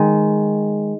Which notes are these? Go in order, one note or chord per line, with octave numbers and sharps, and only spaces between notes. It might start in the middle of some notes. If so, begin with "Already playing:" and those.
Already playing: D#3 G#3